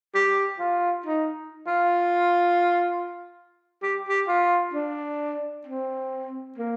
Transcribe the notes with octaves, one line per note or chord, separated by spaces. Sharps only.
G4
F4
D#4
F4
G4
G4
F4
D4
C4
A#3